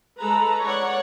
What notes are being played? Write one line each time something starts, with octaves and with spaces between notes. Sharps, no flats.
G#3 A4 B4 A#5
C#5 D5 F#5